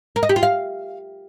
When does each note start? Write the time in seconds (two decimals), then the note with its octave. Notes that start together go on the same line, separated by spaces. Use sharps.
0.16 A#4
0.23 D#5
0.29 G4
0.36 F4
0.43 F5